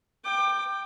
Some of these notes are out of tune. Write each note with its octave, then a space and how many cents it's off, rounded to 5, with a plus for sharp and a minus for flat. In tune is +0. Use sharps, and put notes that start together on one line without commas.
G5 +0 D6 +25